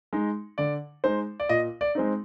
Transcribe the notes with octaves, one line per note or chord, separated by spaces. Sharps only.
G#3 D#4
D3 D5
G#3 D#4 C5
D5
A#2 D#5
D5
G#3 C4 D#4